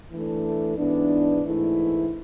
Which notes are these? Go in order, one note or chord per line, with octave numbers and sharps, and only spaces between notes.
E3 A3 D4 A4
G#2 E3 B3 D4
G#2 E3 A3 E4